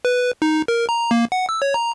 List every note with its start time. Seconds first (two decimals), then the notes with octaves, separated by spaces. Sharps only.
0.05 B4
0.42 D#4
0.68 A#4
0.89 A#5
1.11 A#3
1.32 F#5
1.49 E6
1.62 C#5
1.74 A#5